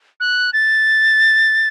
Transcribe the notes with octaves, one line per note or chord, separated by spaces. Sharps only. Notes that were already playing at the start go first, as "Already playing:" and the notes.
F#6
A6